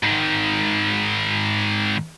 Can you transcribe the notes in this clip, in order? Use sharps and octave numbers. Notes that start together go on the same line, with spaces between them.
G#2 D#3